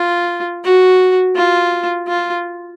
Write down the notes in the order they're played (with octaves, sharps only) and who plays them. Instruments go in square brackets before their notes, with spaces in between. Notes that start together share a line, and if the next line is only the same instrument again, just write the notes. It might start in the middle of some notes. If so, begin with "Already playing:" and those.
Already playing: [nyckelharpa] F4
F#4
F4
F4